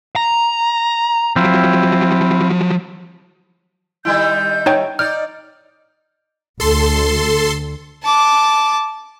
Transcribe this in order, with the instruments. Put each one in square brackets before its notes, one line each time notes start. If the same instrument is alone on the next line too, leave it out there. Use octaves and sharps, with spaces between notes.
[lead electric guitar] A#5
[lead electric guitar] F3 F#3 [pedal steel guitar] C4 E4 F4
[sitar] D#3 G3 E4 [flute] G6
[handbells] D#4 C#5 G5
[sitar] D#4 D5 [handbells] F6 [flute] G6
[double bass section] D2 [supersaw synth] A4 C6
[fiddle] A5 D6